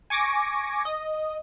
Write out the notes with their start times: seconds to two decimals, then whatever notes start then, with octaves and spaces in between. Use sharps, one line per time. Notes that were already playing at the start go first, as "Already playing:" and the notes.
0.10 G#5 C#6 D6 A#6
0.85 D#5